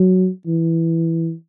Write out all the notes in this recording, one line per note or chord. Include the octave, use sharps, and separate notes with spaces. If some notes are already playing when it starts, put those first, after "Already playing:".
Already playing: F#3
E3